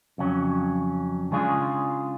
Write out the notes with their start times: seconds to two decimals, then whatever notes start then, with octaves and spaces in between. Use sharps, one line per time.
0.18 F2 C#3 F#3 C#4
1.32 C#3 G#3 D4 F4 G#4